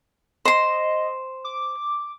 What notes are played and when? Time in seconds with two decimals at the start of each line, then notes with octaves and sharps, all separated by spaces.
0.45 C5 D#5 C6
1.44 D6